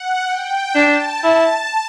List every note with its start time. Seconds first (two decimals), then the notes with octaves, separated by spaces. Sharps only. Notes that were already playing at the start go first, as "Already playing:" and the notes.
Already playing: F#5
0.26 G5
0.75 D4 A5
1.24 E4 A5